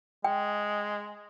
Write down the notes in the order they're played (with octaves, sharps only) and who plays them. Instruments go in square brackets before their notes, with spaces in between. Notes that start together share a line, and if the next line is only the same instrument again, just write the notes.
[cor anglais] G#3 [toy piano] G5